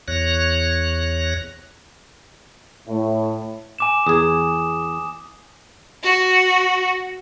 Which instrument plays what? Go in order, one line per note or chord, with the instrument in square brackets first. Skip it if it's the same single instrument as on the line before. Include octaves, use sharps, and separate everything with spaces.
[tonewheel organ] E2 C#5 F#6 A#6
[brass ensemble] A2
[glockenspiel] G#5 D6 E7
[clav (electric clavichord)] E2 G#4 [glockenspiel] D#6
[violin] F#4